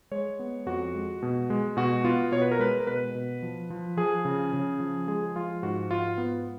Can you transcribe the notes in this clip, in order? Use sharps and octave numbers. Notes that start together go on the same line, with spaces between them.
G#3 C#5
B3
F2 F#4
G#3
B2
G#3
B2 F#4
B3 F4
B2 C#5
B4
A#4
G#3 B4
A#4
B2 B4
B2
F3
F3
F3 G#4
C#3
C#3
F3
G#3 G#4
F3 F4
G#2 F#4
G#2 F4
B3